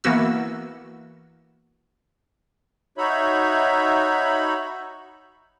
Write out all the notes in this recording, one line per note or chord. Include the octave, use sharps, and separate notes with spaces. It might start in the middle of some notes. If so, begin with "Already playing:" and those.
E3 A#3 B3 F#4 E6
D#4 F#4 C#5 E5 B5